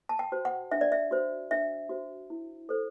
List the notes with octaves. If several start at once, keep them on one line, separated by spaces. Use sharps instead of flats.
A5
G5
F#4 C5
F#5
D4 E5
D5
E5
F#4 C5
D4 E5
F#4 C5
E4
A4 C5